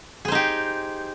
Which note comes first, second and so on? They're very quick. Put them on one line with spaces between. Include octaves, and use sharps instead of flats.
G#4 C5 D#4 G4